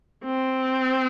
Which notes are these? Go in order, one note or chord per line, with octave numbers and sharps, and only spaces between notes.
C4